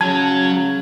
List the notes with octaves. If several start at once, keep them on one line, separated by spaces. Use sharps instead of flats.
C#3 F#3 A5 G#6